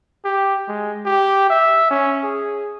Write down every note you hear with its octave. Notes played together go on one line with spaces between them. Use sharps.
G4
G#3
G4
E5
C#4
G#4